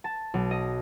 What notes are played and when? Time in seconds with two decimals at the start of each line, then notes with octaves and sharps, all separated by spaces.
0.04 A5
0.34 B1
0.51 D#5